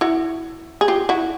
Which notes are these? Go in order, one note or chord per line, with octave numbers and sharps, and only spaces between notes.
E4 F#4
G#4
F4 G4
E4 F#4